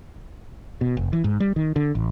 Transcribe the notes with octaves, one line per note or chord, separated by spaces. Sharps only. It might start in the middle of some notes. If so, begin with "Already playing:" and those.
B2
F1
E3
G#2
G3
D#3
D3
A1